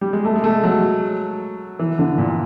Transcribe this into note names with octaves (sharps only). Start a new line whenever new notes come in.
G3
G#3
A3
G#3
A3
F#3
E3
D3
A#2